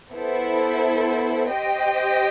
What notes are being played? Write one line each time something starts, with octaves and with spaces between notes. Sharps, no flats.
B3 E4 A4 C5
G4 C5 D#5 G5